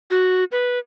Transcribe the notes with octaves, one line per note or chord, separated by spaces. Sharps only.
F#4
B4